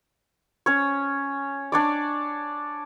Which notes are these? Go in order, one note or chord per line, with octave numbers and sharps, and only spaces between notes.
C#4 C#5
D4 C#5 D5